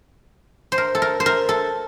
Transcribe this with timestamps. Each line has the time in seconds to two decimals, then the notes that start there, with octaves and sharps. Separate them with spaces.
0.72 C5
0.78 A#4
0.95 A4
1.02 A#4
1.20 C5
1.26 A#4
1.49 A4